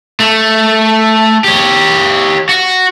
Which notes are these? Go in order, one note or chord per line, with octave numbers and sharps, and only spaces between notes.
A3
G4 C#5
F#4